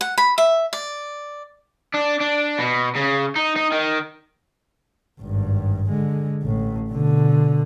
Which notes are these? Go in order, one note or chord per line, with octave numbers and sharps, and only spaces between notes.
F#5
B5
E5
D5
D4
D4
B2
C#3
D#4
D#4
D#3
G#1 G2
D3 G#3
A1 A2
B2 D3